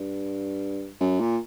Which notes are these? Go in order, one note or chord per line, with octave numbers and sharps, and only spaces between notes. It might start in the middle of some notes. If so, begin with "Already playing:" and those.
Already playing: G2
F#2
A#2